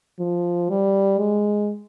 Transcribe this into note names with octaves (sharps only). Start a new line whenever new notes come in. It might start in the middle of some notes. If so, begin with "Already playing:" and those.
F3
G3
G#3